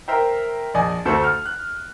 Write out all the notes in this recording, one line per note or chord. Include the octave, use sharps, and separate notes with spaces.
A#4 C5 E5 G5
A#1 D5 D#5 G#5
D2 A3 F#4 A4 C5
F6
F#6